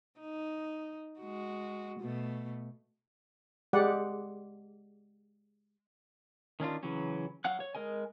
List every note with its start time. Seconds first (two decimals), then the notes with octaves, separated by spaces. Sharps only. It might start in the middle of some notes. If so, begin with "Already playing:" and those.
0.19 D#4
1.20 G#3 F#4
2.00 B2 A3
3.73 G#3 G4 D5 F#5
6.60 D#3 C#4 D4 F4
6.83 C#3 E3 F#3 C#4
7.44 F#3 F5 F#5 F#6
7.60 C#5
7.75 G#3 A#4 D#5 G#5